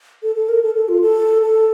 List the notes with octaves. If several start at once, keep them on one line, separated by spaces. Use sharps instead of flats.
A4
A4
A#4
A4
A4
F4
A4
A4